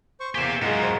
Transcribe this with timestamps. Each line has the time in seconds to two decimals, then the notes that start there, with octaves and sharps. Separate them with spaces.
0.20 C5 C#6
0.35 E2 A#3 G4 E5 G#5
0.62 G#2 D#3 F#3 F4 G#4 F#5
0.83 C5